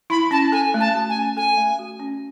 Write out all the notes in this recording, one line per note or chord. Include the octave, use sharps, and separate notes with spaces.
E4 B5
C#4 A5
A4 G#5
A3
A5
F#4
G#5
C#4
A4 G#5
A3
F#4
C#4